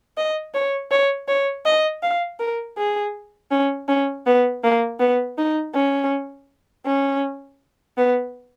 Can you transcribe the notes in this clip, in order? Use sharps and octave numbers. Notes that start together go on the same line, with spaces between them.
D#5
C#5
C#5
C#5
D#5
F5
A#4
G#4
C#4
C#4
B3
A#3
B3
D#4
C#4
C#4
B3